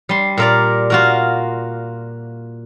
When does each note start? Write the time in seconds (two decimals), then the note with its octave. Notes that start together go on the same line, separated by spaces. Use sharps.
0.09 G3 C6
0.37 A#2 A#4 D5
0.90 F4 F#4 A#4